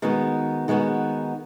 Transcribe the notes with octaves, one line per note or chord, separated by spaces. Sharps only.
D#3 G#3 B3 F#4
D#3 G#3 B3 F#4